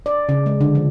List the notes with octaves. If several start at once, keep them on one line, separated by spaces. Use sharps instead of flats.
D5
C#3
G#3
D3
F3